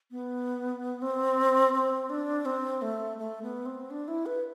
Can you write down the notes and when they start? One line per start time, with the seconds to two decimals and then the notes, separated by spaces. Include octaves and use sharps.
0.11 B3
1.02 C4
1.74 C4
2.10 D4
2.45 C4
2.82 A3
3.18 A3
3.42 B3
3.66 C4
3.90 D4
4.08 E4
4.26 B4